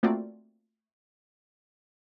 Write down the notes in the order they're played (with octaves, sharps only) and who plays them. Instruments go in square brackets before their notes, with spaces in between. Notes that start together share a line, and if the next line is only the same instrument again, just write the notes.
[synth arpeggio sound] A3 A#3 C4 F4 F#4 D5